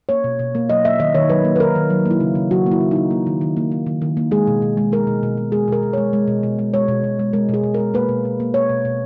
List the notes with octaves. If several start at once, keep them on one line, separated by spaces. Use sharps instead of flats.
A#3 C#5
B2
B2
A#3
F#3 D#5
A#3 E5
D#3 D#5
D#3 C#5
F#3 B4
A#3
B4
D#3 A#4
D#3
F#3
A#3
E4
C#3
C#3
F#3 F#4
A#3
E4
C#3
C#3 D#4
A#3
D#3
D#3
A#3
A#3
D#3
D#3
A#3
G#3 G#4
B2
B2
G#3
G#3 A#4
B2
B2
G#3
G#3 G#4
B2 A#4
B2
G#3 C#5
G#3
B2
B2
G#3
G#3 C#5
B2
B2
G#3
G#3 A#4
B2 G#4
B2
G#3 A#4
A#3 B4
B2
B2
A#3
A#3 C#5
B2
B2